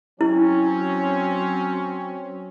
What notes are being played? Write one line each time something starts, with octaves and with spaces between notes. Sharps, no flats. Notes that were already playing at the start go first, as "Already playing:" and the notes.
F#3 C4 C#4 E4